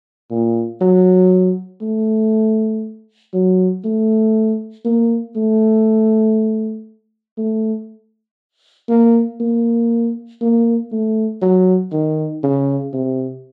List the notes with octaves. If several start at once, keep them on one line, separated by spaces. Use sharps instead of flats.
A#2
F#3
A3
F#3
A3
A#3
A3
A3
A#3
A#3
A#3
A3
F#3
D#3
C#3
C3